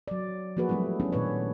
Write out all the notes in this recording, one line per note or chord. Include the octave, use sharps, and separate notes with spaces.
F#3 D5
F3 A#3 F#4 G#4 B4
F#3 G3 A3 C4 E4
B3 C#4 D4 E4
A#2 D#3 B4 C#5